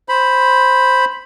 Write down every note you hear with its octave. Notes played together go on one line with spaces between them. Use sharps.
C5 B5